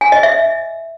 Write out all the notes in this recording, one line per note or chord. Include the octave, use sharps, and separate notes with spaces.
G#5
D#5
E5